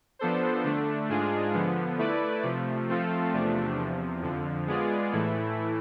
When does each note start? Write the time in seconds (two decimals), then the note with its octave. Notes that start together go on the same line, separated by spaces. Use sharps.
0.19 F3 B3 D4 A4 C5
0.64 D3 A3 D4
1.09 G#2 G#3 D4 F4 G#4
1.54 D3 F3 B3
1.98 A3 E4 B4 D5
2.43 C3 F3 A3
2.88 F3 A3 C4 F4 A4
3.33 E2 C3 F3 A3 D4
3.78 E2 C3 F3
4.22 F2 D3 F3
4.67 G#3 B3 F4 G#4 D5
5.12 A2 E3 A3 E4